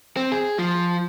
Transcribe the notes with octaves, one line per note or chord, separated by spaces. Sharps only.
C4
G#4
F3